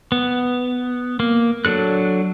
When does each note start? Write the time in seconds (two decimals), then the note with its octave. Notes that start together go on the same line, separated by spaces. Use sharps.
0.12 B3
1.20 A#3
1.65 F#3 D4 A4 F#6